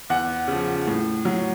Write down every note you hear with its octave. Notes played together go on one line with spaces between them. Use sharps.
E2 F#5
C#3 F3
A2
F#3